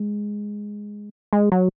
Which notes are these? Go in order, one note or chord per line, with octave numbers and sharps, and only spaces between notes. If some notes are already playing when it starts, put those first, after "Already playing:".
Already playing: G#3
G#3
F#3